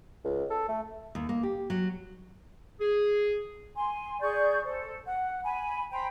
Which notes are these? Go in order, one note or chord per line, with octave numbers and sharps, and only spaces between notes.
C#2
A4
A3
D#2
A#3
G4
F#3
G#4
G#5 C6
G#4 D5 C#6 G6
A4 C5
F#5
G#5 B5
C5 G5 A#5 B5